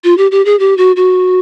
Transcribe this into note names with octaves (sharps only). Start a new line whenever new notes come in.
F4
G4
G4
G#4
G4
F#4
F#4